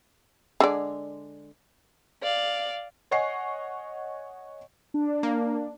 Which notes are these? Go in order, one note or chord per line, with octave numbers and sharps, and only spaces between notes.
D3 G#3 D5
D5 F5
C#5 D#5 F#5 G#5 C#6 C7
D4
A#3